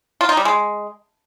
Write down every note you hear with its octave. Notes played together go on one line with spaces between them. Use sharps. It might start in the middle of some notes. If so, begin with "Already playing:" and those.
F4
D#4
G3
G#3